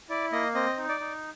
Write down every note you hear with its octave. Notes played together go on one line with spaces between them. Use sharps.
E4 D5
A#3 D#5
C4 D#5
D#4
D5
D#4